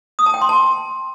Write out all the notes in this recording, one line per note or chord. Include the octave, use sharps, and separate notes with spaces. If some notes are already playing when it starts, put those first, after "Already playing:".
D#6
A5
G5
C6
A5